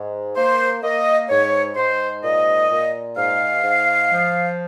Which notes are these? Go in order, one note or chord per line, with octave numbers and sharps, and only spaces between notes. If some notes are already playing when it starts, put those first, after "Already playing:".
Already playing: G#2
A#3 C5
A#3 D#5
G#2 C#5
G#2 C5
A#2 D#5
A#2
G#2 F5
G#2
F3